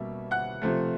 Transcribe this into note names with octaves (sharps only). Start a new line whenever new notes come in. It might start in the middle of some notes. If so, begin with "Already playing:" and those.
Already playing: B2 G3 A#3 C#4 E5
F#5 F#6
C3 F3 A3